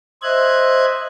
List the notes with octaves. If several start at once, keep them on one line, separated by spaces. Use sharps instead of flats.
C5 D#5 E5 F#6 G#6